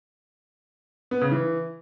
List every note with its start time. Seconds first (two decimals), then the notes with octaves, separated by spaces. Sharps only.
1.11 B3
1.21 C#3
1.32 E3